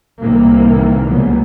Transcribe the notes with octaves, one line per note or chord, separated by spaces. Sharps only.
C2 A2 C3 D#3 E3 A#3
C#2 F#3 G3 A#3 B3